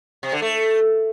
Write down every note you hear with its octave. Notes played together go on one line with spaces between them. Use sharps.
C3
D3
A3